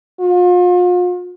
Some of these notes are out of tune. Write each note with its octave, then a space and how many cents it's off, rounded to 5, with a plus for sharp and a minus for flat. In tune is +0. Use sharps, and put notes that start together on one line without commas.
F4 +40